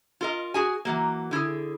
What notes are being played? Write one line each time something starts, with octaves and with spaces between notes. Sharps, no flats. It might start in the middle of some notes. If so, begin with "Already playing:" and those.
F4 A#4 D#5
F#4 G#4 G#5
E3 F#3 A#3
D3 E4 F4 G#4